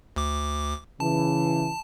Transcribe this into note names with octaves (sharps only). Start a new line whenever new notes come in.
D2 D6
C#3 E3 A5